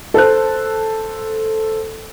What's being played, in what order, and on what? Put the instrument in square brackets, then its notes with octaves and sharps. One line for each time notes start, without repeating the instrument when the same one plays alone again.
[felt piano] A4 C5 F#6